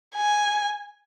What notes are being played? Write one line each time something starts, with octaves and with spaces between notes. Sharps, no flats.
G#5